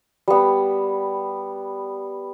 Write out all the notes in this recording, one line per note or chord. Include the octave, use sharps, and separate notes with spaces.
G3 B3